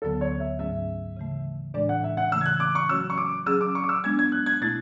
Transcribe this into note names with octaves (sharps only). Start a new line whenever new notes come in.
D2 D3 F#3 B3 A4
C#5
E5
G#2 F#3 A3 C#4 E5
C#3 E3 A3
A2 E3 G#3 D4 D5
F#5
E5
F#5
C#3 E3 A3 E6
G#6
F#6
D6
C#6
F#3 A3 C#4 F#4 C#5 E6
C#6
D6
F#3 C#4 G#4 E6
D6
C#6
D6
E6
G#3 B3 D4 G#6
G#6
F#6
G#6
B2 A3 E4 A6